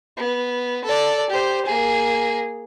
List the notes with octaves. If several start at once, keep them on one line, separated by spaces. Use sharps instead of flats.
B3
A4 D5
G4 C5
A#3 G#4